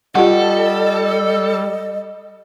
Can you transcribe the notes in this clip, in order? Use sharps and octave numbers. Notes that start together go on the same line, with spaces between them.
G3 F4 G4 A4 D#5 F#5